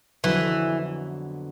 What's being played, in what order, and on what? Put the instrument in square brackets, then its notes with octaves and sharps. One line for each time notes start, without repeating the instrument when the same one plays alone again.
[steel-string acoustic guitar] F2 D3 F#3 B3 [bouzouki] E3